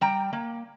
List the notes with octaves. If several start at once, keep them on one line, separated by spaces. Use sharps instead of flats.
G3 G5 A#5
A#3